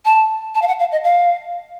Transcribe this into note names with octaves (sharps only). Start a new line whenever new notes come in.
A5
A5
F5
F#5
F5
D#5
F5